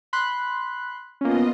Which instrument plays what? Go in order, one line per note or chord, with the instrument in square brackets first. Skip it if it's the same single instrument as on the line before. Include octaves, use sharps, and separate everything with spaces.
[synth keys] B5 C6 F#6
[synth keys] A#3 C#4 [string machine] B3 F4 D#5